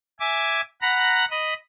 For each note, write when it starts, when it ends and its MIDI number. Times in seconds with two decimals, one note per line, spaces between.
0.20 0.61 76
0.20 0.61 80
0.20 0.61 86
0.82 1.25 78
0.82 1.25 82
0.82 1.25 83
0.82 1.25 94
1.30 1.54 75
1.30 1.54 83